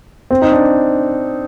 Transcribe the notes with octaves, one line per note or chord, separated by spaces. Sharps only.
C4
D#4
D4